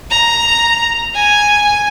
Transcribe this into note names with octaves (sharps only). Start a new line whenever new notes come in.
A#5
G#5